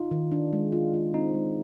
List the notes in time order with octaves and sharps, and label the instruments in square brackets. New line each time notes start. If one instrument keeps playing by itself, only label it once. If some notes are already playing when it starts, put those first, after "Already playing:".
Already playing: [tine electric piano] D#4 F4
[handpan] D#3
D4
G#3
F4
F4
[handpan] C4 [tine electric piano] D#4
[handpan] G#3